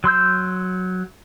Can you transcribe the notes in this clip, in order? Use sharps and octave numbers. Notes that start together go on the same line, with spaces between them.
F#3 C6 E6 G6